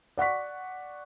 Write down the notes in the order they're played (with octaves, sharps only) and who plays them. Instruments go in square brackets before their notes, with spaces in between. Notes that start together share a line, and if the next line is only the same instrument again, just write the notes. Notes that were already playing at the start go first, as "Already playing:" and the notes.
[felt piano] D5 F#5 C#6 B6